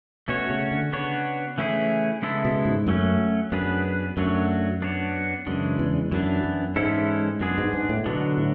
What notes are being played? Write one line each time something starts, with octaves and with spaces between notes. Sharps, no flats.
B2 A3 C#4 F#4 C#5
C#3
D3
C#3 B3 D4 F#4 C#5
E3 A3 C#4 E4 G#4
C#3 G#3 B3 E4 A4
B2
G#2
F#2 F#3 A3 C#4
F#2 B3 D4 G#4 B4
F#2 F#3 A3 D4 F#4 C#5
B3 D4 F#4 C#5
F#2 C#3 E3 G#3 D4
E2
F#2 E3 B3 D4
F#2
G#2 E3 G#3 C#4 E4 A4
F#2 G#3 B3 D4 G#4
G#2
G#2
A2
B2 D3 F#3 B3 D4
A2